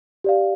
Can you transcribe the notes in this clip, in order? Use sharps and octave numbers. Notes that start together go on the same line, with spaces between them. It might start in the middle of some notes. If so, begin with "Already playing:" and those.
G4 D5 F5